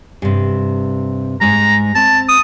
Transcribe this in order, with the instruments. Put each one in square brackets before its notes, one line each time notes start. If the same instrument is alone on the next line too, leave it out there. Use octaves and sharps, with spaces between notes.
[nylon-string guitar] G2 C3
[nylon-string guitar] G#2 G#3 [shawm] A#5
[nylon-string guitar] C4 [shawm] A5
[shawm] D#6